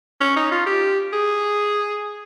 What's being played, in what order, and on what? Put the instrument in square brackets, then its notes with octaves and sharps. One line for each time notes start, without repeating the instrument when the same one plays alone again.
[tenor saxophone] C#4
D#4
F4
G4
G#4